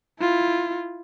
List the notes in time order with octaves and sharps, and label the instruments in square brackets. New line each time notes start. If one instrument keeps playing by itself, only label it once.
[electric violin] E4 F4